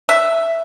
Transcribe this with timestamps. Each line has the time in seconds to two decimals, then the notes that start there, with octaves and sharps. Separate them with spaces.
0.09 E5